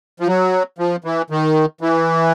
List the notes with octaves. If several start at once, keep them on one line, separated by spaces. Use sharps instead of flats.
F3
F#3
F3
E3
D#3
E3